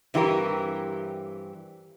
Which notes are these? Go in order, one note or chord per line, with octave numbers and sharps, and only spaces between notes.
G2 E3 C4 G4 A#4